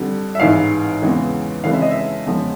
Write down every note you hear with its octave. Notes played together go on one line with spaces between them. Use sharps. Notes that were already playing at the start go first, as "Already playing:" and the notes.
Already playing: F2 D3 G3
E5
A1 G#2 E3 F5
E2 C#3 E3 G#3
F2 C#3 E3 G#3 F5
E5
D#5
E5
E2 C#3 F3 G#3